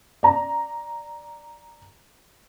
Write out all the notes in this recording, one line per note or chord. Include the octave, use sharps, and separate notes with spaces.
D5 A#5